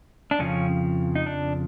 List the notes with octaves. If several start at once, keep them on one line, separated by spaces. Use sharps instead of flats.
D4
F2 C#3 F3 C#4
D#4
D4